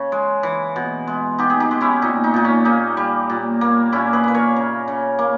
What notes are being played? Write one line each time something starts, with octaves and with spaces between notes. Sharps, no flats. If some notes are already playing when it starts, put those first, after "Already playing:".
Already playing: C#3
G#3
E3
B2
G#3
B2 D#4 G4
G#4
D#4 G4
G#3
C#4 E4
A#2 D#4
D#4
A#2 D#4
C#4
A#3 D#4
G3
A#2
A#3
A#2 C#4 E4
G#4 B4
A#3 B4
A#4 C#5
C#3
C#3
A#3